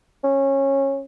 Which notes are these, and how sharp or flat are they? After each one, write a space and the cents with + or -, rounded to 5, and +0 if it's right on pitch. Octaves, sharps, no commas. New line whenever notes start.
C#4 -20